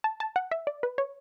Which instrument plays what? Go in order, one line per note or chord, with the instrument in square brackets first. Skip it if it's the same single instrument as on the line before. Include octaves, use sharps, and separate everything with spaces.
[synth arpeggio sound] A5
A5
F#5
E5
D5
B4
C#5